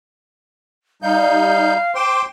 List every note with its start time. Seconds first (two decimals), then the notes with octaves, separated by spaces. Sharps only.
1.02 G3 D#4 F5 G6
1.95 C5 G5 C6 D6